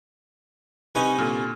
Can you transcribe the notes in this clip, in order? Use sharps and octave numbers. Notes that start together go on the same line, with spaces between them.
C2 C#4 D#4 B4 G#5
A#2 D3